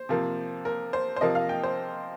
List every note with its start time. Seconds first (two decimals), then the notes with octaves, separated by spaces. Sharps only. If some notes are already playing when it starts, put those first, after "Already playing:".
Already playing: C5
0.09 C3 F3 A#3
0.65 A#4
0.93 C5
1.16 C5
1.21 C3 F3 A#3 D#5
1.35 F5
1.49 G5
1.63 C5